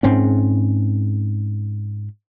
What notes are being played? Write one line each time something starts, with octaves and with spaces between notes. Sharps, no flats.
G#2 C4 C#4